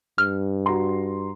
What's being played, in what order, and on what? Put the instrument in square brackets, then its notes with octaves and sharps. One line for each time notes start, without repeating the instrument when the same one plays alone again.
[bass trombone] G2 [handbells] F6
[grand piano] F#4 A#5 C6